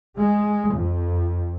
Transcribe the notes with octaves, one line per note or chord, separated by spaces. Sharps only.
G#3
F2